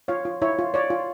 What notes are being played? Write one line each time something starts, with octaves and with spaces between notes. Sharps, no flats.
F4 C#5 F5
F4
E4 C#5 E5
F4
C#5 D5
F4